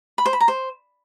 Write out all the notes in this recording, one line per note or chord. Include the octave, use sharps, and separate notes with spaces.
B5
C5
B5
A#5
C5